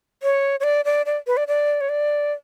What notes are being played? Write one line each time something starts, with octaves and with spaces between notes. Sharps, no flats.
C#5
C#5
D5
D5
D5
B4
D5
D5
C#5
D5